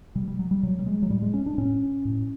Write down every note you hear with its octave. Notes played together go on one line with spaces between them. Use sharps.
B2 G3
G3
F#3
G3
B2 F#3
G3
G#3
F#3
A2 G3
G#3
C#4
D4
A2 C#4
A2